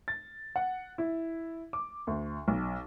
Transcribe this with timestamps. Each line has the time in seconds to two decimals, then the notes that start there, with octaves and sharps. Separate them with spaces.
0.08 A6
0.56 F#5
0.98 E4
1.73 D6
2.07 D2
2.48 B1